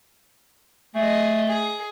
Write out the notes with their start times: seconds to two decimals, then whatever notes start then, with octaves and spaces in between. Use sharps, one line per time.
0.95 A3 G#4 D#5
1.48 G#4